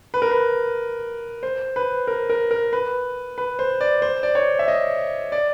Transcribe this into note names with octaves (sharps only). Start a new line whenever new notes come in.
B4
A#4
B4
C5
B4
A#4
A#4
A#4
B4
B4
C5
D5
C5
D5
C#5
E5
D#5
D5